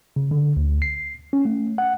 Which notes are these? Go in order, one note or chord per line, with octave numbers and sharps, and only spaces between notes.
C#3
D3
D2
C7
C#4
A3
F#5